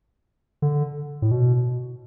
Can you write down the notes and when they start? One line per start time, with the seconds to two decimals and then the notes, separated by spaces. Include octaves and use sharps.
0.62 D3
1.22 A2
1.31 B2